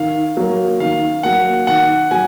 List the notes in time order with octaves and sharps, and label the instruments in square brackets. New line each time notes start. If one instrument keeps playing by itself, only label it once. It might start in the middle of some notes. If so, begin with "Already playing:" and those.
Already playing: [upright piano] D#3 [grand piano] F5
[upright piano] F#3 A#3
[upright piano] D#3 [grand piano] F5
[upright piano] F#3 A#3 [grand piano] F#5
[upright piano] D#3 [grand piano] F#5
[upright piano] F#3 [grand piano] G#5